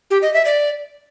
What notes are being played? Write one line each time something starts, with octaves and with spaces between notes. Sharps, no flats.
G4
D#5
E5
D5